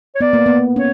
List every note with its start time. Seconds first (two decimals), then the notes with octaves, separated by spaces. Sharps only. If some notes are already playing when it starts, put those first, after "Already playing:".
0.16 C#5
0.21 B3 D5
0.33 A#3
0.46 B3
0.76 C#4 C#5